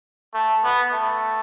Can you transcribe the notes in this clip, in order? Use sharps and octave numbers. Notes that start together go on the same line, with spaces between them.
A3
B3
A3